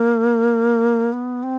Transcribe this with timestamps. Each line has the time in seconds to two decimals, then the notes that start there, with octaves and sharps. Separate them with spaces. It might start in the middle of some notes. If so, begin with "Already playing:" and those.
Already playing: A#3
1.13 B3
1.43 C4